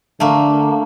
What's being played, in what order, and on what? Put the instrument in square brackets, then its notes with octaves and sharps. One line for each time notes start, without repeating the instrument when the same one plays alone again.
[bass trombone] D3 [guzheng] A3 A#3